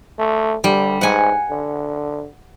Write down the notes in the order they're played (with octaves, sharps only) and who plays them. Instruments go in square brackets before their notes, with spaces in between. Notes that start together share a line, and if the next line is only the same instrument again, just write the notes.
[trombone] A3
[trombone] D3 [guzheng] G3
[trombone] G#2 [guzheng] F#5 G#5
[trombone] D3